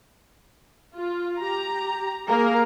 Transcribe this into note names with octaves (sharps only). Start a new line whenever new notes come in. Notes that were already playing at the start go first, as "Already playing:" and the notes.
F4
G4 A#5
A#3 G#4 A#4